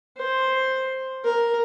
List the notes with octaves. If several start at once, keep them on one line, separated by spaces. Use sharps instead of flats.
C5
A#4